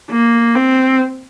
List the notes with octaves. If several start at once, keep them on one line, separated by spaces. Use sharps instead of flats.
A#3
C4